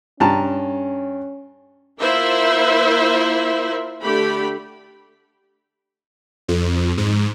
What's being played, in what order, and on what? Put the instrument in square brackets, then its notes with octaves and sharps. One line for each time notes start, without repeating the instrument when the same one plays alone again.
[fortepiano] G2 A5 A#5 [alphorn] C#4
[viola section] A#3 E4 F4 A#4 C5 E5
D3 A3 G4 B5
[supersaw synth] F2
G#2